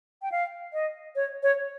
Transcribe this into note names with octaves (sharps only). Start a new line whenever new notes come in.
G5
F5
D#5
C#5
C#5